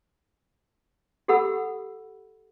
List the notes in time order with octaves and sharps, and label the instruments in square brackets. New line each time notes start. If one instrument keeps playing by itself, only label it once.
[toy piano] G4 A4 F#5 B5 E6